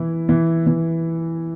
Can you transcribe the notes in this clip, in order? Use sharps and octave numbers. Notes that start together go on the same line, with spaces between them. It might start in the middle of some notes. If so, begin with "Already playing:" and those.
Already playing: E3 E4
E3
E3